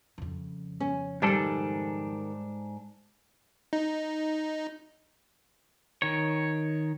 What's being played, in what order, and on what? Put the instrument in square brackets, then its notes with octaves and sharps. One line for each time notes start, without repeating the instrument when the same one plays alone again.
[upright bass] F2 C#3
[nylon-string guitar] C#4
[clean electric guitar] G#2 D4 A4 [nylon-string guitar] D#3 G3
[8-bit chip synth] D#4
[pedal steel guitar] D#3 C#5